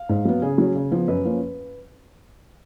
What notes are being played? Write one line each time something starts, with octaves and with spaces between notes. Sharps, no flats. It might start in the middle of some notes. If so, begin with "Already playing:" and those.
Already playing: F5
G#2
F#3 B3
C#3 G#4
F#3 C#4
C#3
F3 B3
F#2 B4
F3 A#3 C#4